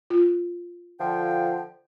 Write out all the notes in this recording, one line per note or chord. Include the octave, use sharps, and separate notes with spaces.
F4
D3 F3 G5